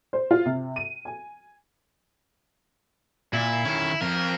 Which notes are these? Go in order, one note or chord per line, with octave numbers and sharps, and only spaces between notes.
C5
F4
C3
D#7
G#5
A#2 E4
D#3 C#4
F2 A#4